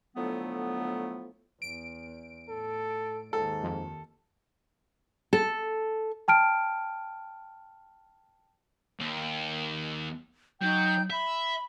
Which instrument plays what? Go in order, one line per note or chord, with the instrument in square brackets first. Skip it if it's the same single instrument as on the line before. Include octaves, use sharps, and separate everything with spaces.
[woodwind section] A2 D3 F3 F#3 A3 B3
[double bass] E2 [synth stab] D7
[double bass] A2 [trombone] A4
[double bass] D#2 D#3 [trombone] G#2 [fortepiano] A4
[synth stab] F2
[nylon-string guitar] A4
[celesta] G5 A5 F6 D7
[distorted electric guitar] D#2
[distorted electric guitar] F#3 [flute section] D#4 G5 G6
[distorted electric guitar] E5 [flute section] B5